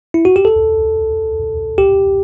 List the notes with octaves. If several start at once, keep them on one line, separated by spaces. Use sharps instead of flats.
E4
F#4
G4
A4
G4